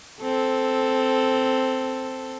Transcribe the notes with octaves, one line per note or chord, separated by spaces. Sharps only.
C4 A4